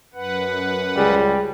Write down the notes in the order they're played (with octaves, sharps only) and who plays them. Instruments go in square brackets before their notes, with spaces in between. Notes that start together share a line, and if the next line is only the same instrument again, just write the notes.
[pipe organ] F#2 B4 F#5
[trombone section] C#2 G#4 [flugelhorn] G3